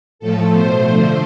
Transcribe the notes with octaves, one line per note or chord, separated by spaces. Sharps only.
A2 F3 A3 A4
B2 A3 C5
D3 F3 A3